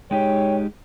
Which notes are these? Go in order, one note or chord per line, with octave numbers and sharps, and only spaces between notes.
G#3 D#4 G4 C#5 G5